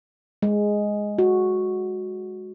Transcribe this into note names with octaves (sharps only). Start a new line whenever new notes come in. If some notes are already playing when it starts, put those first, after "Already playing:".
G#3
F#4